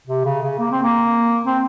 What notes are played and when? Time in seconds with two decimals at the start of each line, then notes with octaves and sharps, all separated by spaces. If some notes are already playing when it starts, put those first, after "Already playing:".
0.07 C3
0.25 C#3
0.42 C#3
0.59 A#3
0.71 C4
0.83 A#3
1.45 C4